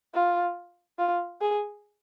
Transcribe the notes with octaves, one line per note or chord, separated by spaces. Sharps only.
F4
F4
G#4